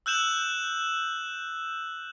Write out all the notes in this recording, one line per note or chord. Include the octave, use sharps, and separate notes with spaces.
E6 F#6 G6 E7 F#7